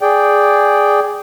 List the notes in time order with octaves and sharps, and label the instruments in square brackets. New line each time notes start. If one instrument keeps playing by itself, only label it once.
[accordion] G#4 D5 G5